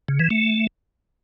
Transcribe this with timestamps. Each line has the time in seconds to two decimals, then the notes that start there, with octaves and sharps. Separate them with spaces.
0.08 C#3
0.19 E3
0.30 A3